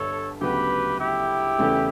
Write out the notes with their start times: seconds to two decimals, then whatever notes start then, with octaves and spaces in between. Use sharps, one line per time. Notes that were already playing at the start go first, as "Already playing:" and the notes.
Already playing: G1 G2 D3 A4 C#5
0.41 D2 C#3 F#3 B3 G4 B4
0.99 E4 G4
1.58 E2 C#3 E3 A3 C#4